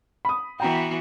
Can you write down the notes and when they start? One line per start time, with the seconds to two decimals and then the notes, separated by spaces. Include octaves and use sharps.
0.25 B5 D#6
0.60 E3 B3 F#4 G5 A#5